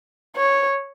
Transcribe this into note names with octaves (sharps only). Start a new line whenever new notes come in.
C#5